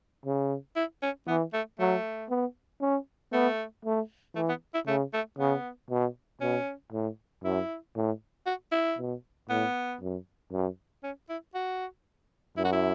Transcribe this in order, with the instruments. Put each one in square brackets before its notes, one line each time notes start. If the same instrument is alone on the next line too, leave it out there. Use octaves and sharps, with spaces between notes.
[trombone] C#3
[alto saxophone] E4
C#4
[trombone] E3 [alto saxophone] B3
[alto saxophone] A3
[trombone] F#3 [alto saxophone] A3
[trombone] B3
C#4
[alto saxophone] A3 [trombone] B3
[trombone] A3
[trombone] E3 [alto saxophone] A3
[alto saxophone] B3
E4
[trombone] C#3 [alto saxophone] A3
[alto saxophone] A3
[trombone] C#3 [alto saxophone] B3
[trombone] B2
[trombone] B2 [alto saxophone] C#4
[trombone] A2
[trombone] F#2 [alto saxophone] E4
[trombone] A2
[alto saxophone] F#4
E4
[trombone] B2
[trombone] A2 [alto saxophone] B3
[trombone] F#2
F#2
[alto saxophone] C#4
E4
F#4
[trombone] F#2 [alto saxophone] E4
[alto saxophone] F#4
E4